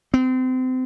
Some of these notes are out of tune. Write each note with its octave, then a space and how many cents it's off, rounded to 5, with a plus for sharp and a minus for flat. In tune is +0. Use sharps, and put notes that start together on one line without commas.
C4 -30